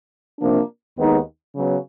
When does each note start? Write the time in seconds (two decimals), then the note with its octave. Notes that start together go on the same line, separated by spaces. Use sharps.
0.39 C3 F3 A#3 D4
0.98 D#2 D#3 G#3 B3 D#4
1.55 C#3 F#3 B3